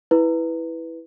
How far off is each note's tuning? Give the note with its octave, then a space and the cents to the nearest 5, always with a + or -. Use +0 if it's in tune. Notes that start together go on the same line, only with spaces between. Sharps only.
E4 -10 B4 +0